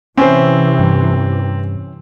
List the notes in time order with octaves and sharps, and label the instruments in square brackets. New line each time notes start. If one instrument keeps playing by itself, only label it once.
[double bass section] C3 E3 [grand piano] C4 [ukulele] C#4 E4 C5
[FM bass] G2